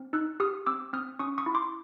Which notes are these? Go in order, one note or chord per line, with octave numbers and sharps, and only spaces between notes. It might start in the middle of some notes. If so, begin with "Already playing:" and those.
Already playing: C4
D#4 E6 F#6
G4 D#6 F6
C4 D6 E6
C4 D#6 F6
C#4 C#6 D#6
C#6 D#6
E4
C6 D6